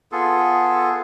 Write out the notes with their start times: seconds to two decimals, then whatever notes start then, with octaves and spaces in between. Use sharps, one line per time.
0.12 B3 F4 G#4 A4